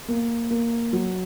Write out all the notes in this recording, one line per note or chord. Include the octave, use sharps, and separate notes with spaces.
A#3
A#3
F#3